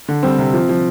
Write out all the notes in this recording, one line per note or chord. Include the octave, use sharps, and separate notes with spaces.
D3
G3 C4
C3
F3
F3